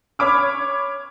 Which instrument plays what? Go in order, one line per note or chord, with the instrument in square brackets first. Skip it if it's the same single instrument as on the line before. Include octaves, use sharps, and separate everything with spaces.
[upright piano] C#5 B5 D6 F6